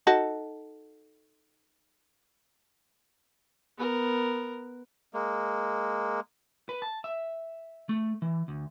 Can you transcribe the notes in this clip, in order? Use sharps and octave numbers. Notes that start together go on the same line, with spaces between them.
D#4 F#4 A4
B3 A#4
G#3 A#3
B4
A5
E5
A3
E3
D2